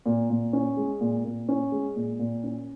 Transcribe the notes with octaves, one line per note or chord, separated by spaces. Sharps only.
A#2
A#2
C#4
G#3
A#2
A#2
C#4
G#3
A#2
A#2
C#4